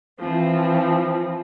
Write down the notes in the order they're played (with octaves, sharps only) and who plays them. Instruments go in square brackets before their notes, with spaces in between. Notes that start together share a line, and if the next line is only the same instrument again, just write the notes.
[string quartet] E3 F3 C4